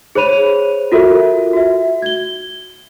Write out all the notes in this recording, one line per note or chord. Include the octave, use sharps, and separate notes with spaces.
G#4 C5 C#5 B5 D#7 F7
F4 F#4 A4 A#4 E5
F#4 E5
G#6 G7